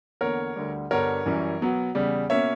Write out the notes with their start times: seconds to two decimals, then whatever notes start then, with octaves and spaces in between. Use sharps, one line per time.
0.21 E2 D3 A#3 A#4 C#5
0.56 D2 D3 G3
0.91 G2 D3 G3 B3 A#4 C#5
1.26 F#2 E3 G3 C#4
1.61 B2 F#3 B3
1.95 E2 C#3 G3
2.30 B2 A#3 C#4 C#5 E5